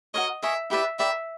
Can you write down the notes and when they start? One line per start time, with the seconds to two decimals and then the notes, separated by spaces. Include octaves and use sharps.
0.14 F#4 A#4 C#5 D#5
0.43 A#4 D#5 E5 G#5 C#6
0.70 E4 G4 B4 D5 E5
0.99 A#4 D5 E5 G5 B5